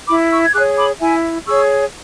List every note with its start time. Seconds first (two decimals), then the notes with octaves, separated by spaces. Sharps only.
0.08 E4 B5 D6
0.31 C#6 E6
0.44 G#6
0.54 G#4 C#5 D6 F#6
0.77 B5 D6
1.00 E4 E5 G#5
1.47 G#4 C#5 C#6 E6